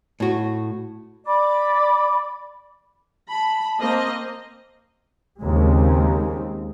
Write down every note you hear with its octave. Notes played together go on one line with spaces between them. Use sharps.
A2 F#4
D5 B5 D6
A5 B5
A#3 C4 D#5
D#2 C#3 G#3 C4